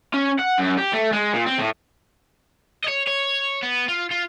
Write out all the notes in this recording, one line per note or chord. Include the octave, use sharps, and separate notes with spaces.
C#4
F#5
F#2
G4
A3
G#3
A#2
C4
A2
C#5 D#5
C#5
B3
F4
F4